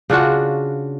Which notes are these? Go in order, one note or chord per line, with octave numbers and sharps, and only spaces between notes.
C#3 D4 F4 F#4